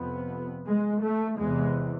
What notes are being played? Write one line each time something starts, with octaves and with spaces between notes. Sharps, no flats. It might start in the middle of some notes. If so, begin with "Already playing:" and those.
Already playing: F2 C3 B3
G#3
A3
E2 C3 G#3